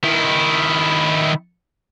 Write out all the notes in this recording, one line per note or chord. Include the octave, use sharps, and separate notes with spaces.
D#3 E4